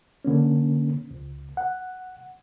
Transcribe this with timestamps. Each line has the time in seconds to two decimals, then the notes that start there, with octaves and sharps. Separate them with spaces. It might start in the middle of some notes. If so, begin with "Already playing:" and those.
0.25 D3 A#3 C#4
1.11 C#2
1.57 F#5